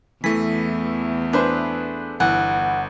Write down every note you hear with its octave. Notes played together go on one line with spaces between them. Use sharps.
E2 E3 A3 B6
D4 G#4 B4 C5
G1 E3 F#5